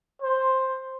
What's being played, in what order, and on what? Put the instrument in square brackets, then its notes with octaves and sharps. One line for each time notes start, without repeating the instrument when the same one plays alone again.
[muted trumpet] C5